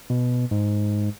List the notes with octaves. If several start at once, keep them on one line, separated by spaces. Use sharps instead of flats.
B2
G#2